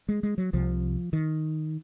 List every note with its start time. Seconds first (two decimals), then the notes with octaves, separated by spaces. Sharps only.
0.09 G#3
0.23 G#3
0.38 F#3
0.53 C2 C3 F3
1.13 D#3